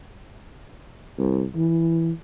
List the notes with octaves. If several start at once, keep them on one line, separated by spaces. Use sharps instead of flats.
C2
E3